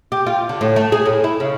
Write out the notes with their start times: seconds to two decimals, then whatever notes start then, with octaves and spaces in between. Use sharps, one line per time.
0.12 G4
0.26 F4
0.49 D3
0.61 A2
0.76 A3
0.92 G#4
1.06 A2
1.24 E4
1.40 C#3